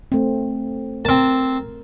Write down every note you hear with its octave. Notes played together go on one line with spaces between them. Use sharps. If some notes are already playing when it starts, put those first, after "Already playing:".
A3 C4
C4 A#4 A5